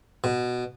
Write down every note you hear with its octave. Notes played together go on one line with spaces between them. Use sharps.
B2